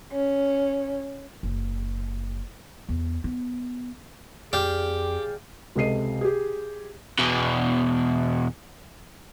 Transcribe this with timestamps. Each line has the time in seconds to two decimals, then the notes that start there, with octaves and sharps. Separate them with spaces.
0.12 C#4
1.43 F#1
2.89 E2
3.24 B3
4.53 F2 G4 G#4 D5 F5 G5
5.75 C#2 C3 A4 D#5 C7 D#7
6.21 G4 G#4
7.19 E2 B2